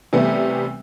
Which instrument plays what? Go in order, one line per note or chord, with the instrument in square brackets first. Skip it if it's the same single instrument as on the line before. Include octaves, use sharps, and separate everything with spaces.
[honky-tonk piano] C3 E3 G3 A3 B3